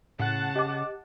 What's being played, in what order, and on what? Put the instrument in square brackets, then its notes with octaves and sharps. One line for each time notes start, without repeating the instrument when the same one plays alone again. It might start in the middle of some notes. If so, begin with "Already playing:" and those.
[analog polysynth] A2 F#6 [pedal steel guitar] C#3 [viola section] F#5 A5
[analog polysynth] G4 [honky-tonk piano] D#5 D6